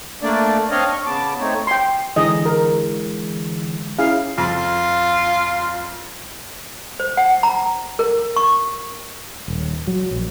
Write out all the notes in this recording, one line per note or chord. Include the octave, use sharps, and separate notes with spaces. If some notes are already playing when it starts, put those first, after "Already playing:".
A3 A#3 D4 D5
C4 D4 C#5 D#5 F5
C#6
C#3 B3 A5 D6
A3 C4 D#4 C#5
G5 C6
D3 E3 G#3 G#4 D#5
A#4
C#4 E4 G#4 F5
F2 F4
C5
F#5
A#5
A#4
C#6
D#1
F#3
A#1